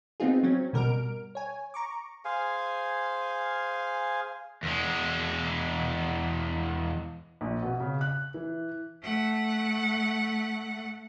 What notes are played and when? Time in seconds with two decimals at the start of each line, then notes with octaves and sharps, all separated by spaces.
0.20 B3 C4 D#4 F4 G#4
0.43 F#3 C4 C#4
0.73 G#1 B2 G3 A#4 F6 D7
1.35 C#5 G#5
1.74 A#5 C#6 D6
2.25 G#4 C5 F5 G#5
4.63 E2 G#3
7.41 A#1
7.63 B2
7.80 C#3
8.01 F#6
8.34 E3
9.02 A3 F#5